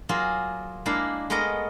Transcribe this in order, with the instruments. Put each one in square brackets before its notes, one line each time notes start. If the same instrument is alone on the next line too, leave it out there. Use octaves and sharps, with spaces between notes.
[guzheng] F#3 A#3 F4 G#4
G#3 A#3 D4 E4 F5
G#3 A3 B3 A#4 D#5